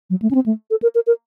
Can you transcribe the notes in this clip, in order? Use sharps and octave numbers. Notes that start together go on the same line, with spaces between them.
F#3
A3
C#4
C4
A3
A4
A#4
A#4
A#4